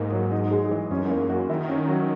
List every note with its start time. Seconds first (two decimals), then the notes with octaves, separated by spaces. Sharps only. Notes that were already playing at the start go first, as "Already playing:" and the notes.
Already playing: G#2 A#3 D#4
0.12 F#3
0.31 D#4
0.51 G#3
0.71 E3
0.91 F#2 C#4
1.09 E2 A#3
1.20 F#2
1.30 F#4
1.49 D#3 E4
1.69 C#4
1.88 F#3